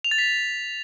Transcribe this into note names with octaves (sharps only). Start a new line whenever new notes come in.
F7
A6
B6